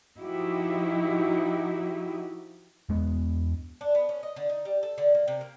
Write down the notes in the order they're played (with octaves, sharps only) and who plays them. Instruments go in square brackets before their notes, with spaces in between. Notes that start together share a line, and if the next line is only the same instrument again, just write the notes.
[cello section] F3 D#4 E4 F#4 G4
[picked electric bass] E2 G#3 B3
[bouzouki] D4
B3
C#4
D#5
D3
D#4
G3
A4
D3
A#3
C3
A#3